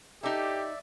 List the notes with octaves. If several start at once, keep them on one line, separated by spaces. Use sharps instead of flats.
D#4 G4 A4 D5 E5